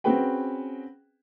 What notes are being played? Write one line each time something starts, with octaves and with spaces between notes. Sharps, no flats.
C4 C#4 F#4 G#4 B4 G5